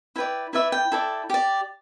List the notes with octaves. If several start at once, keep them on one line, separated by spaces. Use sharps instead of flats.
E4 B4 D5 G5
E4 B4 D5 E5
G5
E4 A4 D5
G4 D5